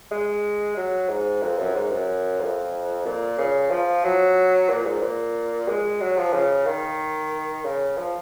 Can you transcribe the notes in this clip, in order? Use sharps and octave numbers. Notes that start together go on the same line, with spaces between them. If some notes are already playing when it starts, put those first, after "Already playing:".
G#3
F#3
G#2
F2
F#2
G#2
F#2
F2
A#2
C#3
F3
F#3
A#2
G#2
A#2
G#3
F#3
F3
C#3
D#3
C#3
F3